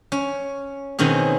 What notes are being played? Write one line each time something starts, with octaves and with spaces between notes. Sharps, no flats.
C#4
B2 D#3 C4 C#4 G#4